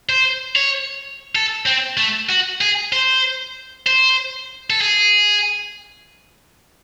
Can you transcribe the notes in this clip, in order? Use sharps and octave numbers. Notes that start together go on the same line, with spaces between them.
C5
C#5
A4
C4
A3
F#4
G#4
C5
C5
A4
G#4